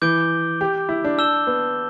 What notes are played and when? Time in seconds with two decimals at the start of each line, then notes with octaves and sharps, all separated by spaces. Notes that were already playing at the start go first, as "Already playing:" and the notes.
0.02 E3 D6 G6 D7 G7
0.61 G4
0.89 E4
1.04 D4
1.18 A5 E6 G6 E7 G7
1.47 B3